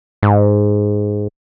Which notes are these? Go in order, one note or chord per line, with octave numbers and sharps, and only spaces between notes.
G#2